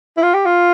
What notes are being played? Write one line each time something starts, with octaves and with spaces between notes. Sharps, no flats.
E4
F4
G4
F4